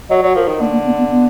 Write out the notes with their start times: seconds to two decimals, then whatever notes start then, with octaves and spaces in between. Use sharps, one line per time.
0.09 F#3 D#5
0.22 F#3 D5
0.35 F3 A#4
0.48 D#3
0.60 D3 A#3
0.72 A#3
0.85 B3
0.98 B3
1.11 B3